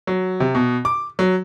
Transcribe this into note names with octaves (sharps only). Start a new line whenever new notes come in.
F#3
C3
B2
D6
F#3